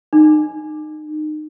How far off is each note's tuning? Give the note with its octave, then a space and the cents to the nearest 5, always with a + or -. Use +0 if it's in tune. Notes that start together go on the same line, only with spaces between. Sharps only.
D#4 -30